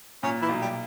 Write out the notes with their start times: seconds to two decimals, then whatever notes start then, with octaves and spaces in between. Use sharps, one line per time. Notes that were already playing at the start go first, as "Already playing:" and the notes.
0.23 A#2 C#4
0.42 E3 E4
0.49 B1
0.61 G3 G4